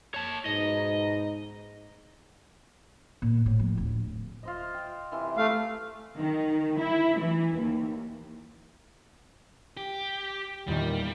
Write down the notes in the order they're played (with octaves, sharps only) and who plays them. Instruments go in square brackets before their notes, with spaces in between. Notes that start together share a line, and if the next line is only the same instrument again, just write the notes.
[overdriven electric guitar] C#5 A5
[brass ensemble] G#2 B2 D#4 [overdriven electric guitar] D#5
[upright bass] A#2
A2
F3
D1
[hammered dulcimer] F4 C5 D#5
G5
C3 E3 C6
[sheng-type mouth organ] A3 F5 [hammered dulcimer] A4 A5
[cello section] D#3
E4
E3
D#2
[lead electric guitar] G4
[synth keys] E2 A#2 D#3 [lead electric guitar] G3